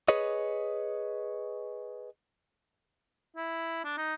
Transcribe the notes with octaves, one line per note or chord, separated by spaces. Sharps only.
G#4 B4 C#5 D#5
E4
D4
D#4